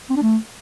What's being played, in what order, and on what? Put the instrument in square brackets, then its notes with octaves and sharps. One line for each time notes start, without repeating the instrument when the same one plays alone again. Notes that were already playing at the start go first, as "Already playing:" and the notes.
[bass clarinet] C4
D4
A3